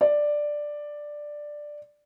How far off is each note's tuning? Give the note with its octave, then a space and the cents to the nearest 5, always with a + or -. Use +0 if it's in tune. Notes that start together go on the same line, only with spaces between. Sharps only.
D5 +5